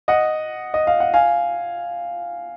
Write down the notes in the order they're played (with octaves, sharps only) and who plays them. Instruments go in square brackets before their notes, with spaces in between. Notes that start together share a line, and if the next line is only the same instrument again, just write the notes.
[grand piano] D#5 F#5
D#5
F5
F#5
F5 G#5